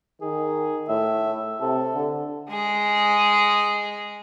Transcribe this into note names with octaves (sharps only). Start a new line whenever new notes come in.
D#3 G#4
A2 E5
C3 A4
D3
G#3 G#4